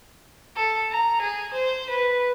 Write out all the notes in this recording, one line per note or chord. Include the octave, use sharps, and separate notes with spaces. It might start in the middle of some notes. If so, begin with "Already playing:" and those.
A4
A#5
G#4
C5
B4